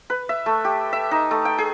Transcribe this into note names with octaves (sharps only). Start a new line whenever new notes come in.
B4
E5
A3
G4
E5
D#4
A3
G5
G#4